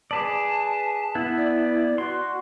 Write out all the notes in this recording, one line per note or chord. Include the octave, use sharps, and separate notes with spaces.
G#4 B4 D5 A5
B3 E4
D5
F#4 C6